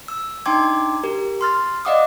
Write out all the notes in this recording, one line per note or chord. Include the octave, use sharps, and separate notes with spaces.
E6
D4 D#4 G5 C6 D6 G#6
G4 A#4
C6 F6 A6
D5 D#5 F5 F#5 D6 D#6